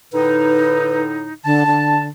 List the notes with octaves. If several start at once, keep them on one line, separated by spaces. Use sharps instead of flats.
A2 D3 D#4 B4
D3 A5
D3